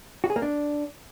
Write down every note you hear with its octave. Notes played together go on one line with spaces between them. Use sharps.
F#4
G#4
A#3
D4